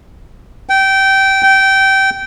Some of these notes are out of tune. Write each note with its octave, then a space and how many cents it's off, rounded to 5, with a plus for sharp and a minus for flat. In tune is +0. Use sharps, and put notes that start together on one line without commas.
G5 -20
G5 -20